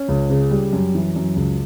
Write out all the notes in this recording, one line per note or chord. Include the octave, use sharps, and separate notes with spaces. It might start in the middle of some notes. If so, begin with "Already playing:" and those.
Already playing: C#4
C#2
C#3
G3
F#2
E3
F#2
C#2